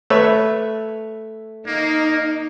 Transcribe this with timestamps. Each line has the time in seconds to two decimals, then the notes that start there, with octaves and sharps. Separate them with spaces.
0.10 A3 B4 C#5 E5
1.67 A#3 D#4